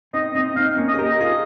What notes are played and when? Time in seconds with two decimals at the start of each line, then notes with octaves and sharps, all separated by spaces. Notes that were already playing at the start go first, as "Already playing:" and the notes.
0.14 C4 D#4 D#5
0.35 C4 D#4 D#5
0.56 C4 D#4 F5
0.77 A#3 C#4
0.88 D#5
0.94 G#4
0.99 G4 A#4
1.04 D#5
1.21 F4 G#4